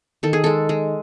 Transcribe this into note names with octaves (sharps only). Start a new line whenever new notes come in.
D#3 A4
G#4
G#3 A4
G#3